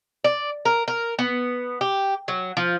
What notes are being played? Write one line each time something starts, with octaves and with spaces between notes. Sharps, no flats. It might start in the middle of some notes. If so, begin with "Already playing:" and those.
D5
A#4
A#4
B3
G4
F#3
F3